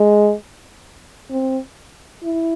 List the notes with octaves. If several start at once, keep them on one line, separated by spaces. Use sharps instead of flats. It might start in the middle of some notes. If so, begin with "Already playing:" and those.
Already playing: G#3
C4
E4